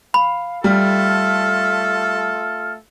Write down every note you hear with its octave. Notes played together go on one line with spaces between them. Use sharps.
F5 B5
G3 A3 F4 A4 F6